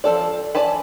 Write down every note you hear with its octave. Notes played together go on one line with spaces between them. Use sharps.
F3 C4 A4 D5
D5 G#5 A5 B5